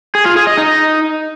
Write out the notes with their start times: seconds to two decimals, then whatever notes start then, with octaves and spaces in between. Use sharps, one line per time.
0.15 G#4
0.25 F4
0.36 G#4
0.47 D#5
0.58 D#4